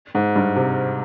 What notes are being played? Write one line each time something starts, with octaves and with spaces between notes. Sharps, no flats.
G#2
G2
C3